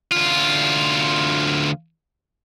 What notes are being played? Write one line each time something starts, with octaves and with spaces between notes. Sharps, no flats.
D2 F4